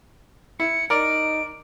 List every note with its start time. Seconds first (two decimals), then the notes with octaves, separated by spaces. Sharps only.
0.60 E4 C#7
0.90 D#4 A#4 D5 D7